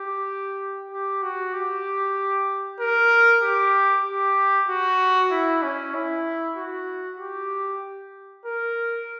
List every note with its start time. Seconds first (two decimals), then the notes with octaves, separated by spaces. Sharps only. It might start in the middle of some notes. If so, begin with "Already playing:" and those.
Already playing: G4
0.91 G4
1.23 F#4
1.54 G4
2.80 A#4
3.42 G4
4.05 G4
4.68 F#4
5.31 E4
5.63 C#4
5.94 E4
6.57 F#4
7.19 G4
8.46 A#4